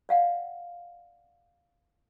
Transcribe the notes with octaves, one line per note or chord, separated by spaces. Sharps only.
D5 F5 F#5